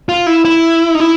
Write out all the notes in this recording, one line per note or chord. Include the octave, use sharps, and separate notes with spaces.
F4
E4
E4
D#4
E4